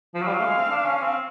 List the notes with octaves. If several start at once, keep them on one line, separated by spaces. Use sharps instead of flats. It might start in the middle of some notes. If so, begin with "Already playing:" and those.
F3
F#3 F5
G3
F#3
A3
G#3
C4
D4
C#4
C4